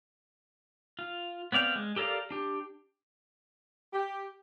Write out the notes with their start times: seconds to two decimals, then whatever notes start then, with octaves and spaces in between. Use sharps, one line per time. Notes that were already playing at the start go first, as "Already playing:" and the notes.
0.99 F4
1.52 B3 C4 D5 F5 G5
1.76 G#3
1.96 G4 A4 A#4 D5 F5
2.31 D4 G4
3.92 G4